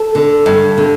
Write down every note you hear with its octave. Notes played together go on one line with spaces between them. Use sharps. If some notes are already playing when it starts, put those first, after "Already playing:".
Already playing: A4
D3
G2
D3